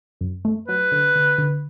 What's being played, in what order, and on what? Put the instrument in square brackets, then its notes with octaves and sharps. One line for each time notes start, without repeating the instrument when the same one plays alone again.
[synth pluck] F#2
A3
[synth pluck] F#3 [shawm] B4
[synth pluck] D3
D3
D3